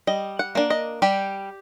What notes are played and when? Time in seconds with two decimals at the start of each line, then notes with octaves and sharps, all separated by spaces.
0.07 G3 D#5
0.39 F#5
0.55 A#3 D4
0.70 D#5
1.02 G3 G4